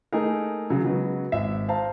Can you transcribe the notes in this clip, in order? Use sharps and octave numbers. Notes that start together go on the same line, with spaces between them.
A3 A#3 D#4 G#4 A#4
C#3 F#3
C#3 F#3 G#3 B3
G#1 E5
C5 F5 A5 A#5